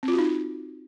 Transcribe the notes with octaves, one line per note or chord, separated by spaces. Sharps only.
C4
F4
F#4
D#4